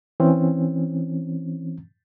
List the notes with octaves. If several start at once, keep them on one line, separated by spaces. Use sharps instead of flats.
E3 C4 C#4